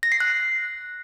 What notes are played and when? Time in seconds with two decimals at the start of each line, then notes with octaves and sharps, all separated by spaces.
0.03 A#6
0.12 C7
0.20 F#6